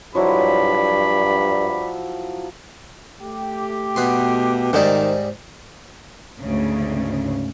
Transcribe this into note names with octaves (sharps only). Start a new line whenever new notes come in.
G2 F3 F#3 E4 D5 B5
A3 G4
B2 B3 C6
G#2 D#3 G3 D#4 C5 D5
D2 G#2 C#3